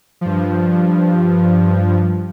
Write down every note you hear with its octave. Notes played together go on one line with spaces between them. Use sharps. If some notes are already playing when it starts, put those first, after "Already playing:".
G2 F3